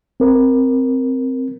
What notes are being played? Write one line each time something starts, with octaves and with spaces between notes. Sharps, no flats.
C4 A#4